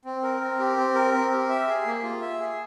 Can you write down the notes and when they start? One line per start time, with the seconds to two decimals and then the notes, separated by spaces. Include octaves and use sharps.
0.05 C4
0.23 A#4
0.41 C4
0.59 G4
0.77 C4
0.95 A#4
1.14 C4
1.32 G4
1.49 E5
1.68 G#4
1.86 A#3
2.03 F4
2.21 E5
2.39 G#4